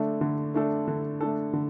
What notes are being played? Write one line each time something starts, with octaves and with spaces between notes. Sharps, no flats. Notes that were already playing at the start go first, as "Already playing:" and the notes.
Already playing: D3 A3 D4 A4
D3
A3 D4 A4
D3
A3 D4 A4
D3